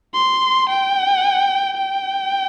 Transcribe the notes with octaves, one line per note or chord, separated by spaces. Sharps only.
C6
G5
G5